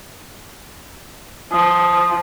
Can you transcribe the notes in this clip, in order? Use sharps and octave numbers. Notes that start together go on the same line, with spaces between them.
F3 D#6